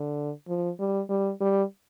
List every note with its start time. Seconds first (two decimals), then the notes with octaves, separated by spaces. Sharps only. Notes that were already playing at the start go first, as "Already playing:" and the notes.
Already playing: D3
0.48 F3
0.80 G3
1.09 G3
1.41 G3